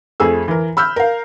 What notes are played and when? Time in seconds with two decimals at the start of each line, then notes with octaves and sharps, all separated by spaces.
0.20 F2 A3 G#4 E6
0.48 E3 A#4
0.77 B5 E6 F6 G6
0.96 A#4 F5